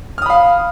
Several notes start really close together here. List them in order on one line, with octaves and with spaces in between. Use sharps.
F6 D#6 B5 F5